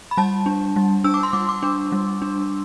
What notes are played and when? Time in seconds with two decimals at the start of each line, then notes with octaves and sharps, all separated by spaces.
0.11 B5
0.17 G3 A5
0.46 D4
0.76 G3
1.04 D4 E6
1.14 D6
1.23 C6
1.33 G3 D6
1.49 D6
1.63 D4
1.92 G3
2.22 D4